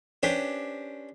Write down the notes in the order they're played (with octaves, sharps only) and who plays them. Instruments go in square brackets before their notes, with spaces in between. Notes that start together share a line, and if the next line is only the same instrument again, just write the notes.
[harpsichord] C#4 D4 G4 B4 C5